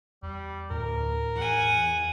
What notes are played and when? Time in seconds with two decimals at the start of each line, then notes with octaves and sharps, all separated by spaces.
0.23 E2 G3
0.70 D2 A2 A#4
1.36 E2 F#5 G#5